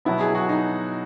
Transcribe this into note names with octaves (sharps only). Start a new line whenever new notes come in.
B2 F#3 B3 E4
G#4
F#4
D#4